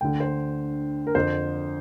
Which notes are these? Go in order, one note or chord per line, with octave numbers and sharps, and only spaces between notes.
D2 D3 G5
C5
A#4
F2 D3 C5